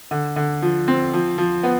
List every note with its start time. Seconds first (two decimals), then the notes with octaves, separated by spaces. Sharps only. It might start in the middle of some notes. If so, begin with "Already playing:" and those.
0.11 D3
0.36 D3
0.62 F3
0.88 C4
1.13 F3
1.38 F3
1.63 B3